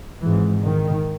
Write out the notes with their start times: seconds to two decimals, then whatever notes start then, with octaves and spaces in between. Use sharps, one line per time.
0.22 G#1 G#2 E3
0.65 D#3